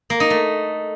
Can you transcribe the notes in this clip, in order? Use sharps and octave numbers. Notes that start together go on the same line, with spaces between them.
A#3
D#4
A3